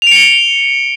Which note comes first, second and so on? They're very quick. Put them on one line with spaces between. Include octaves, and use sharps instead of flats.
F7 D7 C#7 G7